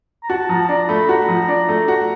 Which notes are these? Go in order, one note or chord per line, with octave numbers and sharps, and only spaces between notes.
A#5
F#4 A5
F3 A#5
A5
D4 A#5
A3 B5
F#4 A#5
F3
D4
A3
F#4